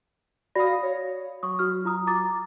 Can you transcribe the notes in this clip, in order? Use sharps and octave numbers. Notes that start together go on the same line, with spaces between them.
F#4 D5 F5 B5 D#6 A#6
C#5
F#3 C#6 D#6
F#4 F6
F4 A#5 D#6
A#5 D6 A6